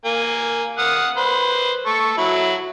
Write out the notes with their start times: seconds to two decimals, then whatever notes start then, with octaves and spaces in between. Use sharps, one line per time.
0.05 A#3 G#5
0.78 F5 F#5 D#6
1.17 B4 C5
1.86 A4 C#6
2.18 F#3 E4